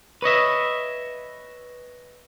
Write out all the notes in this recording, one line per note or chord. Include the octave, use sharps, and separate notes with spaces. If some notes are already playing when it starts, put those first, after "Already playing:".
B4 C#5 D#5 E5